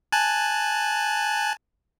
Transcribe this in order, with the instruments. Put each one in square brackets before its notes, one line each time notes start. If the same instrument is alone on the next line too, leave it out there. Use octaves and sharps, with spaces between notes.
[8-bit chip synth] G#5 A5 F#6